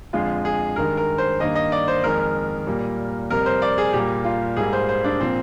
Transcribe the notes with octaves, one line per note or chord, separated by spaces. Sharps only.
F2 D3 G#3 F4
G#4
G2 D#3 G#3 A#4
A#4
C5
G2 D#3 A#3 D#5
D#5
D5
C5
F2 D#3 G#3 A#4
A#2 G3 A#3
F2 C3 G3 A#4
C5
D5
G#4
A#2 G3 A#3 G4
F4
G#2 G3 A#3 G#4
C5
C5
D4
A#2 F3 A#3 C4